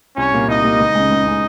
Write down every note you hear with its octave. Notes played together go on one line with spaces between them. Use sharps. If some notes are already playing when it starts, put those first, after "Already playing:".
C2 C#4 C#5
A#2 G3 A#3
C2 D#4 D#5
A#2 G3 A#3
C#2
C#3 G#3
C#2
C#3 G#3